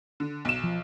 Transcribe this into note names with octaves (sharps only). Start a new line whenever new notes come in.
D3
B1 E7
F3